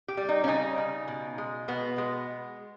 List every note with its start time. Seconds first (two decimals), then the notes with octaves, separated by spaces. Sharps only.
0.08 G4
0.17 G3
0.29 D#4
0.44 C#4
0.48 C#3 D#4
0.78 C#3
1.08 B2
1.38 G#3
1.68 B2 B3
1.98 G#3